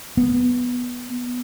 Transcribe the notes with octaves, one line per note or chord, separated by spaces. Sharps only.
B3